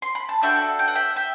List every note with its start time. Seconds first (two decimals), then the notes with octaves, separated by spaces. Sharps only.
0.02 C6
0.15 B5
0.29 A5
0.42 D4 F#4 A4 E5 G5
0.79 G5
0.88 F#5
0.95 E5 G5
1.16 E5 G5